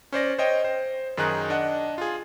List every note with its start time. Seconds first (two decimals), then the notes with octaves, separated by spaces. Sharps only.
0.13 C#4 C5 D5 A#6
0.39 C5 C#5 D#5 G5
0.64 C5
1.17 F#2 D#3 D#4 G#4 F#6
1.50 D4 D#5 F#5
1.98 F4 G#4